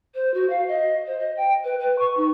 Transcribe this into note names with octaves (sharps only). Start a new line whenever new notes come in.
C5
F#4
F5
D#5
C5
D#5
G5
B4
B4
C#6
D#4